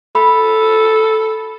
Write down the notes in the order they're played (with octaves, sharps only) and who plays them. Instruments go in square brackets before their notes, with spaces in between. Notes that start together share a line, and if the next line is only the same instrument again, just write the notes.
[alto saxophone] A4 [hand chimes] B5